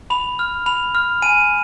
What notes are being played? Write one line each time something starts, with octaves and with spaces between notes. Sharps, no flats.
B5 F7
F6
B5 F7
F6
G#5 D#7